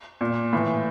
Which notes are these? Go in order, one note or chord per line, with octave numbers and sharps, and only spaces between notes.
A#2
A2 E3